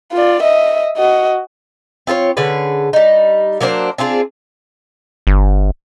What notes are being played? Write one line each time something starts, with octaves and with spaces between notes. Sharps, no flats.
F4 D5
D#5 E5
F#4 D#5
C4 F4 A4 C#5
D3 C#4 G#4 B4
G3 D#4
F#3 A#3 D4 C5
C4 D4 F4 G#4
G1